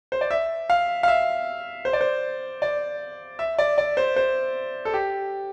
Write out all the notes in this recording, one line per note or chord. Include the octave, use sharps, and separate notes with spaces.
C5
D5
E5
F5
F5
E5
C5
D5
C5
D5
E5
D5
D5
C5
C5
A4
G4